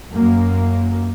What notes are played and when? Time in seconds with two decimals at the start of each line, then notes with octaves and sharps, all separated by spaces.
0.10 F#2 A#3